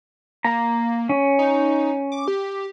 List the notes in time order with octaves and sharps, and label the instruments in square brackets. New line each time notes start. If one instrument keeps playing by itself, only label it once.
[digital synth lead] A#3 [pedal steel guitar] A#5
[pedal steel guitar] C#4
[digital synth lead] D#4
D6
G4